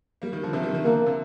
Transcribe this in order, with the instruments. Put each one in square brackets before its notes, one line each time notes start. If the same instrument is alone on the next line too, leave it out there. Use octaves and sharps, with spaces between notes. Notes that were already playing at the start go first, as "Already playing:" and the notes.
[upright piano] G3 A#3
D#3 G3
D3 F3
C3 D#3
D#3 G3
D#3 G3
[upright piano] D3 F3 [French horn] A#3
[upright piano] C3